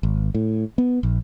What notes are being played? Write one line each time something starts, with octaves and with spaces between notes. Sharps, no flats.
G#1
A2
B3
A#1